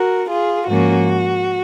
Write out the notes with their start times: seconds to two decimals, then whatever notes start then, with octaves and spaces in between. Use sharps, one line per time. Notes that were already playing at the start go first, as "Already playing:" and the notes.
Already playing: F#4 A#4
0.29 F4 G#4
0.68 G#2 F3 A#3 C#4 F#4